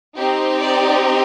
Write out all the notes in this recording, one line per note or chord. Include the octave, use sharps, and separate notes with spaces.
C4 D#4 G4
D5